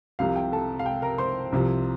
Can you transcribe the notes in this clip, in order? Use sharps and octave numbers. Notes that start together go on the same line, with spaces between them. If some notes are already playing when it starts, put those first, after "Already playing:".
C2 C3 F3 F5
F5
G5
A4 A5
F5
G5
A#4 A#5
C5 C6
C2 C3 F3